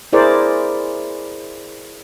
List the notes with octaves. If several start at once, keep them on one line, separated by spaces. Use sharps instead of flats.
E4 G#4 A#4 C5 D5